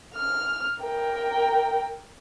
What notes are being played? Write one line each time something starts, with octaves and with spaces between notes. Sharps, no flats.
F6
A#4 G5